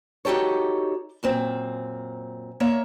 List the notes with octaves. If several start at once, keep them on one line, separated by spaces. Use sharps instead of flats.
D#4 F#4 G4 A4 C#5
F#2 A#2 C4
A#3 C#5 E5